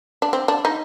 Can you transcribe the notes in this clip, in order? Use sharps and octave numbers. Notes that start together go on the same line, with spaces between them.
D4
C4
D4
D#4